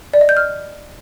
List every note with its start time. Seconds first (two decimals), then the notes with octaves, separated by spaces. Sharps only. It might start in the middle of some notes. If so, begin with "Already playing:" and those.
0.14 D5
0.21 D#5
0.29 G6
0.37 F6